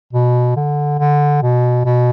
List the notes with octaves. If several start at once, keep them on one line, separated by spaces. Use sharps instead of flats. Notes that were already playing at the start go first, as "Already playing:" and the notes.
B2
D3
D3
B2
B2